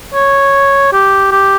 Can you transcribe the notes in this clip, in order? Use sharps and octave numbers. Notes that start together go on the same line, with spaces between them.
C#5
G4
G4